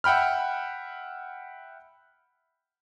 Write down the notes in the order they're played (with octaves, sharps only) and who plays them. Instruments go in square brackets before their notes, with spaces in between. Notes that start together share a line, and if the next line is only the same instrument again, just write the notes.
[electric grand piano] E5 F#5 G5 B5 F6